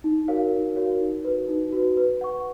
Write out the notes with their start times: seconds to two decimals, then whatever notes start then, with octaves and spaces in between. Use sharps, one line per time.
0.04 D#4
0.28 F#4 A#4 C#5 F5
0.52 D#4
0.76 F#4 A#4 C#5 F5
1.00 D#4
1.25 F#4 B4
1.48 D#4
1.73 F#4 B4
1.97 B4
2.21 F#5 C#6